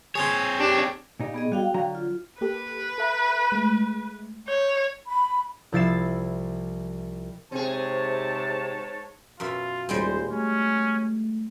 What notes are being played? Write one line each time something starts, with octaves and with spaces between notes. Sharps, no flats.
C4 G#4 C#5 A5 C6
D4 G4
A#2 D#4 G4
B3 G#4 D#5
G3 F#4 F5 G5
D3 F#3 A#5
F4
A#3 G4 A4 B4
A4 E5 A#5
G#3 A3
C#5 G6
B5
C2 F3 E4 A6 C7 E7
G#2 C3 C4 G#4 C#5 A5
F#2 B2 F4 E5
D#1 G3 G#3 C4 C5
A3 C#4